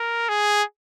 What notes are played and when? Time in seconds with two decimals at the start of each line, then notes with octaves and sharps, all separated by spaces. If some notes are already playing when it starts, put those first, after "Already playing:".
Already playing: A#4
0.29 G#4